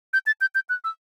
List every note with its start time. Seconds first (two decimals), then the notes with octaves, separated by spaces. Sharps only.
0.13 G6
0.27 A6
0.41 G6
0.55 G6
0.69 F#6
0.84 E6